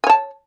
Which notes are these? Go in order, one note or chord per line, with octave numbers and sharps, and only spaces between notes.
C#5 G#5 A5